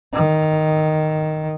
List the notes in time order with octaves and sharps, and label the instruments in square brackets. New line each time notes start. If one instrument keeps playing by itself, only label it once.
[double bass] D#3